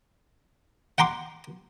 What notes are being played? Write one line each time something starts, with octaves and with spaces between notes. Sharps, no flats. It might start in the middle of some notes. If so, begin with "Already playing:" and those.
F#5 G5 A#5 C6 D6